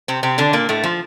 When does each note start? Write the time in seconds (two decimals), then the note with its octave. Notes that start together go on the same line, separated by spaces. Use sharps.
0.08 C3 C4
0.23 C3 C4
0.38 D3 D4
0.53 A#2 A#3
0.69 A2 A3
0.84 F3